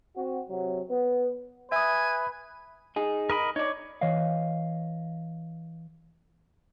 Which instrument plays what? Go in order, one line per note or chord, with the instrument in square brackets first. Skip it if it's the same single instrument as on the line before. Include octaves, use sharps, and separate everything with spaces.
[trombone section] C4 F#4
C3 F#3
B3
[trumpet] B4 [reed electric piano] E5 D#6 [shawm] G#5
[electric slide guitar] D#4 G#4
[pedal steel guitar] A#4 D#5 B5
[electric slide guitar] D#4 D5 [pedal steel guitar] C#5
[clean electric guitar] E3 C#5 D#5 F5